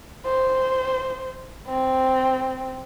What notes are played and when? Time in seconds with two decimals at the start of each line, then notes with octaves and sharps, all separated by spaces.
0.25 C5
1.67 C4